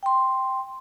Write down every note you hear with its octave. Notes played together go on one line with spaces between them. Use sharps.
G5 C6